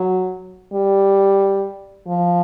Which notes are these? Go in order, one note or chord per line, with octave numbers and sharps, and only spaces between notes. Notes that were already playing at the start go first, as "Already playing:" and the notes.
Already playing: F#3
G3
F3